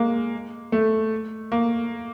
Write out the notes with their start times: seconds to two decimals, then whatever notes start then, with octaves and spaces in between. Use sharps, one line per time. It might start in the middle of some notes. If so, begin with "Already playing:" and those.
Already playing: G#3 A#3
0.72 A3
1.52 A#3